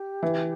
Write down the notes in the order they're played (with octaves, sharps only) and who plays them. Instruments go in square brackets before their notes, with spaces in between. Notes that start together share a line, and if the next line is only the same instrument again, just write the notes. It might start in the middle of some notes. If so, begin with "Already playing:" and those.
Already playing: [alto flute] G4
[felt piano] E3